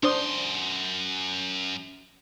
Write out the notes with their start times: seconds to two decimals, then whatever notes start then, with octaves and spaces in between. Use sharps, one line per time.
0.03 F#2 D4 C5 C6 D#6